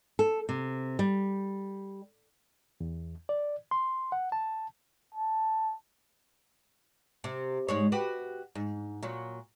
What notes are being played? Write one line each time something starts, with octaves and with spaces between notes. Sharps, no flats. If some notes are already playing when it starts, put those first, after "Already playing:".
A4
C3
G3
E2
D5
C6
F#5
A5
A5
C3
G#2 G#3 C#5
F#4 G4 B4
G#2
A#2 F#3